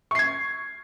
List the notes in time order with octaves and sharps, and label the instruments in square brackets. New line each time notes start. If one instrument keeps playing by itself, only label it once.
[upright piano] C#6
C7
G#6